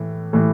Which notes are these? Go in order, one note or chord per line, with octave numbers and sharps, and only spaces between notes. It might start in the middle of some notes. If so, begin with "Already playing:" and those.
Already playing: A2 E3
A2 E3